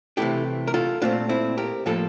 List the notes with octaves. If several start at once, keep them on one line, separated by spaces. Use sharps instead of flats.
C3 E3 A3 E4 G4
A#4
F4 A4
A#2 A3 C4 D4 F4
C4 E4
G4 A#4
A2 F3 A#3 F4 A4